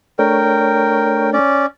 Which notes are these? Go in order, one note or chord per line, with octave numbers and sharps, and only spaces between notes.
A3 D4 A#4 C#5 G5
C#4 D5